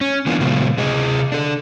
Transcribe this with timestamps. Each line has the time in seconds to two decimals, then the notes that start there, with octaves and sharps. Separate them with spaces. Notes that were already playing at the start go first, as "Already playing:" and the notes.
0.01 C#4
0.26 E3 A#3 B3 D4 F4
0.41 A#2 C#3 F#3 G#3 A3 B3
0.77 C3 G#4 D#5
1.32 D4 A4